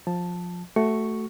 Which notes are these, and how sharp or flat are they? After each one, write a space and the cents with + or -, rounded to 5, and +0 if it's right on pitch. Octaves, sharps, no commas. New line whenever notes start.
F3 +15 A5 +0
A3 +0 F#4 +20 C#6 +0